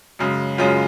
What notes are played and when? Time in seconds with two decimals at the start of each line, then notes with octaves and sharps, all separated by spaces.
0.19 F#2 C#3 G#3
0.58 F#2 C#3 G#3 C#4 F4